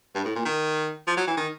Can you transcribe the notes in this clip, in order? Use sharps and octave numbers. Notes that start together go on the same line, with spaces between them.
G2
A2
A#2
D#3
F3
F#3
E3
D#3